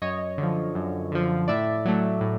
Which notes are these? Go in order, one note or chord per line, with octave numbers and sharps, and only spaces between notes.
F#2 C#5 D#5
D3 F3
F#2
D3 F3
A2 D5 E5
F#3 A3
A2